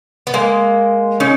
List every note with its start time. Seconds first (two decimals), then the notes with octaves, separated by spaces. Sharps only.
0.27 B3
0.34 G#3 A#3
1.20 C#4 D#4